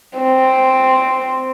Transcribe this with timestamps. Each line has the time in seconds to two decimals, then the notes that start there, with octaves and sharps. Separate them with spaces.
0.18 C4